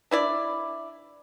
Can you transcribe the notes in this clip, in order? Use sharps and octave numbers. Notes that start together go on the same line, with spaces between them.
D4 E4 D5